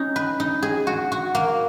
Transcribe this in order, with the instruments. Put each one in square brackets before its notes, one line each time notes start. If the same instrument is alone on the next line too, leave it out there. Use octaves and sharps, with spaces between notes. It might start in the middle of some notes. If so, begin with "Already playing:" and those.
Already playing: [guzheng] C#4 D#4
B4
D#4
G#4
F#4
F#4
A#3